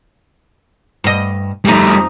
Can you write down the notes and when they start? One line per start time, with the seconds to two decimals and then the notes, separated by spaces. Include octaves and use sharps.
1.04 G2 D#5
1.65 F2 G3 A3 D#4